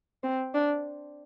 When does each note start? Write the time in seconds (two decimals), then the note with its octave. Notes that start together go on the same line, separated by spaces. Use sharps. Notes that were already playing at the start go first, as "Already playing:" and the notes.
0.23 C4
0.54 D4